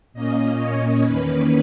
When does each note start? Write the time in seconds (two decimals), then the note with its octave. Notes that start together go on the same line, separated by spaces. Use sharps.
0.13 A#2 A#3 C#4 D#5
0.58 C#5
1.01 E2 D#3 A#3 C#4 B4